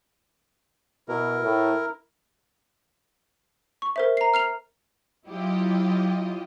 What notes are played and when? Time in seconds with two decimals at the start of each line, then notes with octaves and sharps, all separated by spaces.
1.08 B2 E4 A#4
1.43 A2
3.82 C#6
3.96 A#4 C5 E5
4.17 A#5 C7
4.34 F6 C7 F7
5.26 F#3 E4 F4 G4 D#5